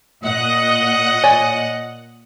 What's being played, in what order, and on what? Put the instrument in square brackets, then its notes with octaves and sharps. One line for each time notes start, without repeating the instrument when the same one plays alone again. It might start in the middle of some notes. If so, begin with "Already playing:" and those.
[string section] A#2 F#5 F#6 [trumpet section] D#5
[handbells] C#5 D5 G#5